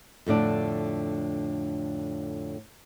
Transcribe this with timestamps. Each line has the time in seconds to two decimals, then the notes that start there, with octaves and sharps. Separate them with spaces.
0.26 F2 A2 D3 D4